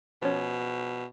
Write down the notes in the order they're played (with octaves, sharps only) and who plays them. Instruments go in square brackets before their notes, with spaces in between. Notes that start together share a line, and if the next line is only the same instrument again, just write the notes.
[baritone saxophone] B2 [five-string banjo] F3 C#4